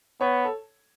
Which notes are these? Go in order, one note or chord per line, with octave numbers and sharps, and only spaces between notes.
B3 C#5
A4